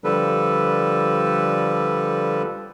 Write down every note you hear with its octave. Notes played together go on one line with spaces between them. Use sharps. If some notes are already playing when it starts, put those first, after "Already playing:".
D3 F3 G3 A4 B4